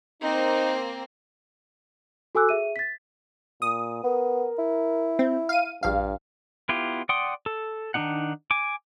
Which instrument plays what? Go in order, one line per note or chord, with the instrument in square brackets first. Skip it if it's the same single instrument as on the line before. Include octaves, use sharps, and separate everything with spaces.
[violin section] A#3 C4 [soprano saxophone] D#4
[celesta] F#4 A4 G#5 D6 E6 F#6
G#4 E5 D#7
A6 B6
[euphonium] A#2 [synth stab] D#6
[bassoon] B3 [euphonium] A#4
[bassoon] E4
[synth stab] C4
F5 D#7
[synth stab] A#1 F5 [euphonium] G2
[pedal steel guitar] B3 E4 F4 G4
D5 F#5 G5 C6 D#6
A4
D#3 A3 D4 D#4 F#5
G#5 D6